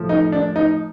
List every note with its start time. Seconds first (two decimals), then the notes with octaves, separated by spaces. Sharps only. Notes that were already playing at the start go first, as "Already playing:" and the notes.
Already playing: A2 F3 A3
0.09 D#4
0.32 D4
0.56 D#4